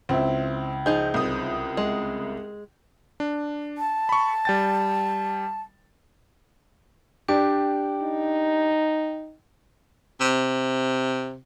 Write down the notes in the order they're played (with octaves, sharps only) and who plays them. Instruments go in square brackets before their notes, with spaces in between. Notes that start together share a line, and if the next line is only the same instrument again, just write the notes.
[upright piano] C#2 E4 [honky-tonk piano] C4
[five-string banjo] F3 D#4 G#4 [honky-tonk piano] G6
[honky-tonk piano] C2 D#6
[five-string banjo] G#3
[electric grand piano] D4
[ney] A5
[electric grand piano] B5 C#6
G3 G5 A6
[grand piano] D4 G4 D5 [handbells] G5
[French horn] D#4
[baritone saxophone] C3